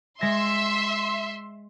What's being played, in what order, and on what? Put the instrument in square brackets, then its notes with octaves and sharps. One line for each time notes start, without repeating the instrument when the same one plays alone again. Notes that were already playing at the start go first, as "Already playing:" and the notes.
[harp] G#3 A#6 [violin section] E5 C6